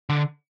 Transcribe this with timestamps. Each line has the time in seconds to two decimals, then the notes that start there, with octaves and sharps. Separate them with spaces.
0.10 D3